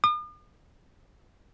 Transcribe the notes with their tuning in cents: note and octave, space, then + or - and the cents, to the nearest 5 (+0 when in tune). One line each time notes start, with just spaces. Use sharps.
D#6 -45